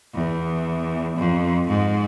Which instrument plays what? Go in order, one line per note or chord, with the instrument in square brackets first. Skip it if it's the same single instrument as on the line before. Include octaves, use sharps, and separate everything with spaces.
[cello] E2
F2
G#2